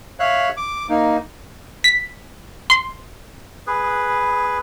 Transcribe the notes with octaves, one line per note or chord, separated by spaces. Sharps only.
C#5 E5 F5 F#6
D6
A#3 D#4
B6
C6
G#4 B4